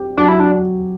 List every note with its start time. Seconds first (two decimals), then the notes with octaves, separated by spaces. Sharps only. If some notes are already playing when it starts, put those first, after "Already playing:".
Already playing: C4 G4
0.17 F#3 D4
0.28 E4
0.40 D4